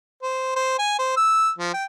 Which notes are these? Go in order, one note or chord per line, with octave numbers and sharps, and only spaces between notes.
C5
C5
G#5
C5
E6
F3
G5